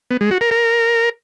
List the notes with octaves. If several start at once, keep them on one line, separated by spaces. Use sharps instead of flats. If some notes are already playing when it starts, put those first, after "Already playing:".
B3
G#3
F#4
A#4
A#4